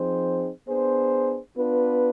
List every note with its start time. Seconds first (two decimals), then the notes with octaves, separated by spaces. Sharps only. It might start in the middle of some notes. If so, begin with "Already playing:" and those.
Already playing: F3 C4 D#4 G#4 C5
0.68 B3 D4 G#4 C5
1.58 B3 D4 F4 B4